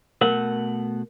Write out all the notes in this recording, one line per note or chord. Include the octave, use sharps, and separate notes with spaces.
B2 A3 A#4 F#5